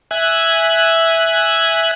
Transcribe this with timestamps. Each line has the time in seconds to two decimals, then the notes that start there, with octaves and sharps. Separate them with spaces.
0.11 E5 G#5 F#6